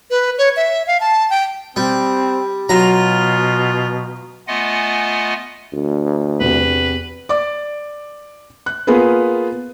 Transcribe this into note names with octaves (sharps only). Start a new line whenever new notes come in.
B4
C#5
E5
F5
A5
G5
G3 C4
B2 F#3 F4 A#5
A3 B3 F4 D#5 F#5 G#5
D2
E2 C3 B4
D5 D6
F#6
A#3 B3 F4 G#4 B4